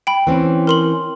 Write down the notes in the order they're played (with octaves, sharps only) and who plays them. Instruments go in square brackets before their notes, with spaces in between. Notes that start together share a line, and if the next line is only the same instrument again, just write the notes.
[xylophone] G5 B5
[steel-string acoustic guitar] E3 C4 C#4
[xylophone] A#4 C6 F#7